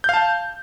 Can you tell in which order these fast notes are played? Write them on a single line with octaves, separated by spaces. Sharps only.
G6 F5 A5